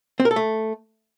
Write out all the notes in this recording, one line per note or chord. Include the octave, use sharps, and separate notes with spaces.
C4
A#4
A4
A3